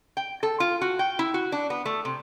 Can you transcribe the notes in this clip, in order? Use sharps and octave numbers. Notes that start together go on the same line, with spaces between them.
G5
A4
F4
F#4
G5
E4
F#4
D4
B3
A3
C3